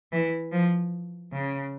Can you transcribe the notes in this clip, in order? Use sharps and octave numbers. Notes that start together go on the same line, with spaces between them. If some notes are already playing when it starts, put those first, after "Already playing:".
E3
F3
C#3